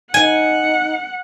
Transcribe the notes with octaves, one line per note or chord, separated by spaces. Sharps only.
D#4 F#5 G#5